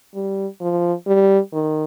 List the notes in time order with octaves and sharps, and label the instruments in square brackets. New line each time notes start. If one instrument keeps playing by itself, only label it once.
[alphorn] G3
F3
G3
D#3